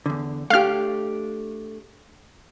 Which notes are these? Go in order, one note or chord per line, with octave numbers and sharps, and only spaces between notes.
E2 D3
A3 D4 G4 F5 F6